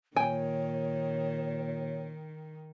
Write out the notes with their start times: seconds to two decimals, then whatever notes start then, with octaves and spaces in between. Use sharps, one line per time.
0.16 A#2 D#3 C#5 G5 G#5